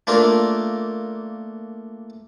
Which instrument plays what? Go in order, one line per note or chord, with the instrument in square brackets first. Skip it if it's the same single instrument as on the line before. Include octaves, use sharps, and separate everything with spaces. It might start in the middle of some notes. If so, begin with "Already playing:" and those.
[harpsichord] A3 A#3 D4 F4 A#4